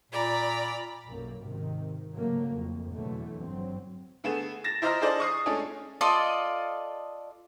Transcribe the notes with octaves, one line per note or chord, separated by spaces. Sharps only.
A#2 D5 A#5 B5
B1 F#2 A#3
G#1 C3 D#3
G#2 C#3 F#3 A3 A#3
F2
E2 B2 D3 E3 F#3 A3
G#1 G2 F#3 C4
D3 A3 B3 G#4 E7
A6 A#6 E7
E4 C5 D#5 A#5 F6 A#6
D4 G#4 A4 C5 D5 D#5
C#6 D#6 C7
G#3 A3 C#4 D4 G#4 A4
F4 A4 D5 D#5